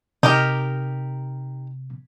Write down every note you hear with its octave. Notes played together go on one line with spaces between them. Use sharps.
C3 D#4 G4 A#4